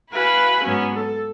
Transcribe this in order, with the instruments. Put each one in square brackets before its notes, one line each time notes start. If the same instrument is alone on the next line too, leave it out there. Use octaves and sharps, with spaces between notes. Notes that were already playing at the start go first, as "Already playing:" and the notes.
[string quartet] E4 F#4 B4 F5 G#5
G#2 F#3 B3 C#4
A4